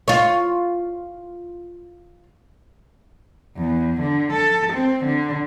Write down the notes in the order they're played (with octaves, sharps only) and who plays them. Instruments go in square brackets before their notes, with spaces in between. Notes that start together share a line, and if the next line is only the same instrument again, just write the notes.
[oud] F4 C#5
[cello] E2
D3
A4
C4
D3